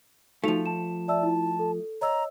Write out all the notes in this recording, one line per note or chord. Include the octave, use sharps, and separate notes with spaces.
F3 A3 D#4 F#4 F7
A5 E7
D5 E5 A5 E6
E4
A4
C#5 D#5 A#5 E6